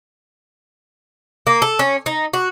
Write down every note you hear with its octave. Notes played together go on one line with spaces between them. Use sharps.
A#3
A4
C#4
D#4
F#4